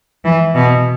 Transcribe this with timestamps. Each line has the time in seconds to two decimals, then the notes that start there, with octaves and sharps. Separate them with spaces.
0.24 E3
0.55 B2